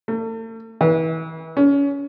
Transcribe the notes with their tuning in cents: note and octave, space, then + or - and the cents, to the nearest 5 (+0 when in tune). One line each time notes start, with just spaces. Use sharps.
A3 +40
E3 -35
C#4 +25